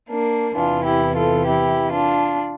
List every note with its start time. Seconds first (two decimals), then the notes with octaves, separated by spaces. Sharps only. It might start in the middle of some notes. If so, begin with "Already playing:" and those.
0.10 A#3 D4
0.55 E2 C3 E3 D4 F4
0.85 E4 G4
1.16 F4 A4
1.46 E4 G4
1.91 D4 F4